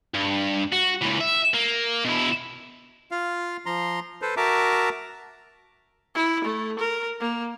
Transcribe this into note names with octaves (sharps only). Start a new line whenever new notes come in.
G2
F#4
C#2 E3
E5
A#3
B2 E4
F4 F5
F3 A#5 C6
A4 B4 C5
F#4 A#4 E5 A5 A#5 D6
E4
A3
A#4
A#3